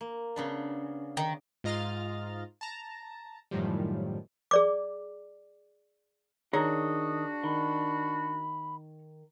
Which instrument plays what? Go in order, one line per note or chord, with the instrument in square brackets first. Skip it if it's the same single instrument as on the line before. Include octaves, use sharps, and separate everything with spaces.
[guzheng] A#3
C#3 B3 D4
[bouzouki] D#3
[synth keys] G#2 F4 D#5 A#5 F6 A6
A5 A#5
F#2 A2 D#3 F3 G3
[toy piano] G#4 D5 D6
[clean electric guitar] D#3 [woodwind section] D4 F#4 [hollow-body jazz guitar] G#4 C#5 A#5 [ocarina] D#6
[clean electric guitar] D#3 [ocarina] B5